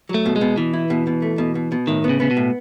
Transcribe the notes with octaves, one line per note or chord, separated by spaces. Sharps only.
F#3
A3
B2
G#3
B2
B2 E3
E4
B2
B2
A3
B2
B2
B2
A2 D#3
B3
C#3
C#3 B3
B2
A2